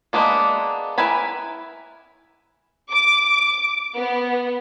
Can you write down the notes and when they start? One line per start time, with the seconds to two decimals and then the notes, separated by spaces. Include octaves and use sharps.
0.13 G#3 A#3 B3 D4
0.98 E4 A#4 B4 G#5 B5
2.91 D6
3.96 B3